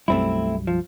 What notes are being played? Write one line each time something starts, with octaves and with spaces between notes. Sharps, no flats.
B1 F#2 G3 A3 C4 E4
F3